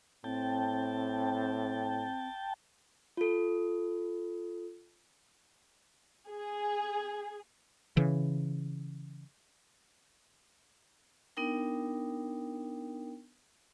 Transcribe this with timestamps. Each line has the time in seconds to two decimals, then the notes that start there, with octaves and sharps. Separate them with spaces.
0.24 A2 C4 G5 A5
3.17 F4 A4
6.30 G#4
7.97 C#3 E3
11.37 B3 D4 D#4 A#4 G5